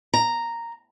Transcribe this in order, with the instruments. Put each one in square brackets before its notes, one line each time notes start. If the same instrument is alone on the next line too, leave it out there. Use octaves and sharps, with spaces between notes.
[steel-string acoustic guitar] A#5